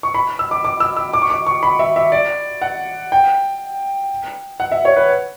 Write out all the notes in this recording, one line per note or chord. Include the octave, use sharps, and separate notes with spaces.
C#6
B5
E6
D6
D6
E6
E6
D6
C#6
D6
C#6
B5
E5
E5
D5
F#5
G5
F#5
E5
C#5
B4